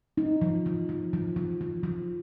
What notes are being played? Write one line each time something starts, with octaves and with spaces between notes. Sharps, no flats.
D#4
F3
F3
F3
F3
F3
F3
F3